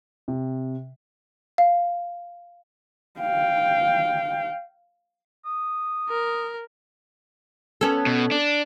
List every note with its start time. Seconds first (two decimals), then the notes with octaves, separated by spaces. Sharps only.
0.28 C3
1.58 F5
3.20 F5 G5
5.46 D#6
6.09 A#4
7.81 B3 C#4 A4
8.06 B2
8.31 D4